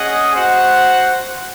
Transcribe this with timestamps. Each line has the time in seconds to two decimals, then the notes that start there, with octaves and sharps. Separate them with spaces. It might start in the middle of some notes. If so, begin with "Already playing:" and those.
Already playing: C#4 G#4 D#5 F#5
0.35 F#4 C5 F#5